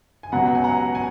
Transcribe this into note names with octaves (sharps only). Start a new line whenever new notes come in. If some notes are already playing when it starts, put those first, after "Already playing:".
G#5
C#2 B2 F#3 B3 F#5 A#5
G#5
F#5 A#5
G#5